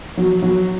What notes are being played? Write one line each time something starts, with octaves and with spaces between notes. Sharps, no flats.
F#3
F#3